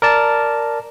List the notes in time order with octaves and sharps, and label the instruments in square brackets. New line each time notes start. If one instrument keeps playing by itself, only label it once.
[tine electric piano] A#4 D5 A5